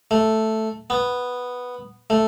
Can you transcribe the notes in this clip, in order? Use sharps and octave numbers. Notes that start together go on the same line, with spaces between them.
A3
B3
A3